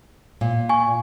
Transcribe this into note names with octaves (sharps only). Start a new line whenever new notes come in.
A#2
G#5 C#6